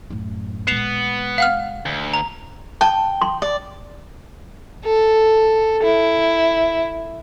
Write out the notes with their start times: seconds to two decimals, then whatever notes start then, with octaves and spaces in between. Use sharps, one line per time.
0.10 F#2 A2
0.67 A#1 G#3 B3 C7 E7 F7
1.38 F5 F#5 F6
1.86 D2
2.14 A#5
2.81 G5 A5
3.21 C6
3.42 D5
4.85 A4
5.83 E4